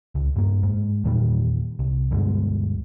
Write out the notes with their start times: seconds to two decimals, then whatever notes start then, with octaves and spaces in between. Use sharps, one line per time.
0.15 C#2
0.36 G2 A#3
0.63 G#2
1.04 E2 A#2 D#3 G3
1.79 C2
2.11 D2 G2 B2 G#3